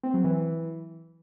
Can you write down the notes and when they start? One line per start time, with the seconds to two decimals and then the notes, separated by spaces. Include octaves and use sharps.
0.03 C4
0.14 F#3
0.24 E3